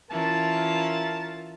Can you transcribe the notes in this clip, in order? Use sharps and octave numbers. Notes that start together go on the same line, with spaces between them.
E3 C#4 F4 A#4 A5